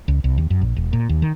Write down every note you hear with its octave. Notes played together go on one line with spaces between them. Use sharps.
C#2
C2
D#2
F#2
A#1
E1
A#2
D#2
D#3